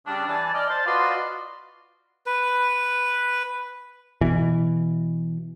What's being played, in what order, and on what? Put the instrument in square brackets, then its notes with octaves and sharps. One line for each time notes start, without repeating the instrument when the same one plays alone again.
[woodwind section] C#3 G3 D4
E3 D5 G#5 A5
D5 D#5 F6
C5 A5
F4 F#4 B4 D5 D#5 C6
[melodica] B4
[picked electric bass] B2 E3